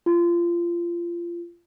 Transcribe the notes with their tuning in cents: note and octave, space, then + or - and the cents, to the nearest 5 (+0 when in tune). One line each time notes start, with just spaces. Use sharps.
F4 -25